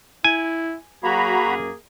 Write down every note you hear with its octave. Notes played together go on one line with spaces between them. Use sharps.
E4 G#5
F#3 A#3 F#4 G#4 A#5 B5
F#2